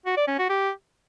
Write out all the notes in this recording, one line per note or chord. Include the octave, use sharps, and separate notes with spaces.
F#4
D5
C#4
F#4
G4